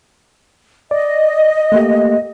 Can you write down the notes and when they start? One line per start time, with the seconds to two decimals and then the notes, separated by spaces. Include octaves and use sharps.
0.91 D5 D#5
1.72 A3 A#3 G4